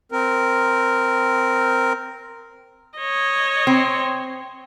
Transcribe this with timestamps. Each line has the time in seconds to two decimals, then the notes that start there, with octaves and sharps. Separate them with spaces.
0.12 C4 A#4
2.99 C#5 D#5
3.67 C4